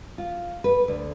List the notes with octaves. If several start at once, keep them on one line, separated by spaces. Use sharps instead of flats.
F4
B4
D2